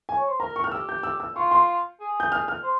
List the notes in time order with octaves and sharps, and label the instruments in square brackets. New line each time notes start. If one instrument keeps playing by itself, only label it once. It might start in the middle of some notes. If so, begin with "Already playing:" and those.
[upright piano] G#5
[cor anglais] C#5
C5
[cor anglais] A#4 [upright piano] A#5
[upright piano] C#6
F6
[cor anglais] G4 [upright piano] E6
[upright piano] G6
E6
E6
[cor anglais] F4 [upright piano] C#6
[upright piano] C6
[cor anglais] G#4
[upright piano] G6
F6
F6
[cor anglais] C5